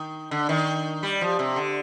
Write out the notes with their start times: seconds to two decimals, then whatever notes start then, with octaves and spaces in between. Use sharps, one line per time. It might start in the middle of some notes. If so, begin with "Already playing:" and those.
Already playing: D#3
0.31 D3
0.49 D#3
1.03 G3
1.21 F3
1.39 C3
1.56 D3